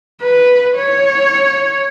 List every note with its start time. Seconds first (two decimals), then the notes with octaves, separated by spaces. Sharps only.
0.22 B4
0.76 C#5